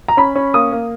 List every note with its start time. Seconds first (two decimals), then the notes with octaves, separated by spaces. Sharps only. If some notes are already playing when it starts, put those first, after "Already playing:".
0.08 A#5
0.17 C#4 B5
0.35 C#4
0.54 A#3 D#6
0.72 A#3